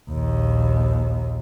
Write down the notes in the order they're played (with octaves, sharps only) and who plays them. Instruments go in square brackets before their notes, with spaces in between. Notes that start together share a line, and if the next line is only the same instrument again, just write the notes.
[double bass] A#1 D#2